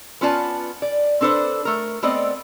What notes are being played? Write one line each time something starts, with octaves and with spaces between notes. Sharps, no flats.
B3 C#4 F4 B4 D5 A5
D5
C4 D4 A4 B4 C5
A3 A#4
A3 B3 C4 D5 D#5